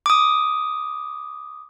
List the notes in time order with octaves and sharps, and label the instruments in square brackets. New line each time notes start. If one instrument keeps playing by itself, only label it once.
[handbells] D6 D#6